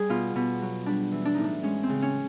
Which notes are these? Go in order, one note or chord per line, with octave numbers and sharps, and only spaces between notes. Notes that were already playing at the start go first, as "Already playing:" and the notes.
Already playing: G3 G#4
B2 F4
B2
F#3
G3 D4
E3
D4
A2 D#4
D4
G#3 C#4
C4
C#3
C#4